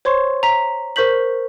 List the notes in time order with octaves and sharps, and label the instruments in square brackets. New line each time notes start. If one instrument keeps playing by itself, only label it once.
[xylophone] C5 C#5 C6 C#6
A#5 B6
A#4 C5 C#6 G6 B6 F#7